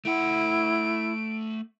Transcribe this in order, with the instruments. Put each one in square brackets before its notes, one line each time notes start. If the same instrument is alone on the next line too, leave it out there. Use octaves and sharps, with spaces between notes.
[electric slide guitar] A3 F#5 [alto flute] E4 [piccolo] D7